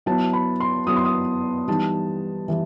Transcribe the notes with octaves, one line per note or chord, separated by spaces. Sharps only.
F#3 B3 E4 A5
B5
C6
F#3 B3 E4 D#6
C6
D#6
E3 G3 B3 D#4 A5
E3 G3